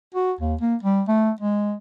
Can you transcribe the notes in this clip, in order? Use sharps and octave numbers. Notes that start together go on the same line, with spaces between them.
F#4
D#2
A#3
G3
A3
G#3